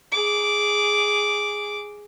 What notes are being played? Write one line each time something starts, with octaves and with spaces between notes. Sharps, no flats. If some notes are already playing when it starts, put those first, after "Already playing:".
G#4 D6